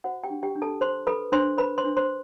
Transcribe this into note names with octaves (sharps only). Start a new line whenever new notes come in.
F#4 C5 F#5
G4 G5
D4
G4 G5
D4
A4 A5
C5 C6
A4 B4 B5
D4 C5 C6
B4 C5 B5
C5 C6
D4
C5 C6